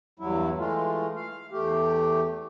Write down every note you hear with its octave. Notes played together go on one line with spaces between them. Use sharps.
E2 G2 F#3 E4
E3 G#3 A3 F4
F5
E2 A3 G4